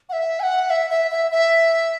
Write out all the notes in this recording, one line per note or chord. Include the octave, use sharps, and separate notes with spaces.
F#5
E5
G#5
F#5
E5
E5
E5
E5